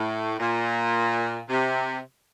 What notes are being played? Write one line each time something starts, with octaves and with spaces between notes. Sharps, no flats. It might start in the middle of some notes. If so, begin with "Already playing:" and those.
Already playing: A2
A#2
C3